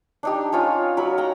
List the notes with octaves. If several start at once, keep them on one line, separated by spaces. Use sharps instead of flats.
D4 D#4 G4
C#4 F4 C#5 G#5
F#3 A#4 B5
G5 A#5